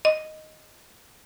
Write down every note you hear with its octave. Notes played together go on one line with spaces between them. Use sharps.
D#5